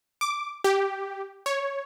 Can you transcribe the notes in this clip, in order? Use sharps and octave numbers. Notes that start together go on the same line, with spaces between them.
D6
G4
C#5